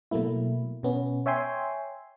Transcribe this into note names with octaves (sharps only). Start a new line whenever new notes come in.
B2 F#3 A3 A#3 E4
B2 B3 C#4
C#5 E5 G5 G#5 C6